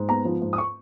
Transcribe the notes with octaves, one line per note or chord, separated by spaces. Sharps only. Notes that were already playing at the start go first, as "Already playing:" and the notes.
Already playing: G#2
B3 A#5
F3
G#2
D#6
C#6